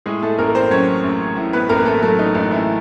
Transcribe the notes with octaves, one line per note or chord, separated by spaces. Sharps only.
A2 G#3 G#4
A3 A4
A1 A#3 A#4
C4 C5
F#3 C#4 C#5
A1
A2
B3 B4
A1 A#3 A#4
A3 A4
F#3 A3 A4
D#4
A1 D#4
E3 E4